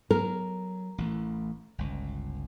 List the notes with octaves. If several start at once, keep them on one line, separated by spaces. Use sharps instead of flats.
F#3 A#4
A1 E3 A3
G1 C#2